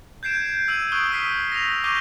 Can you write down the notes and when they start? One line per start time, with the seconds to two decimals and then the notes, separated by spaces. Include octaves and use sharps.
0.23 G6 G#6 C7 D7 E7
0.68 E6 D#7 F#7
0.92 C#6 D#6 F#6 D7 D#7 G7
1.12 E6 F6 B6 C7
1.52 A#6 F7
1.84 C#6 D6 F6 G6 D#7 G7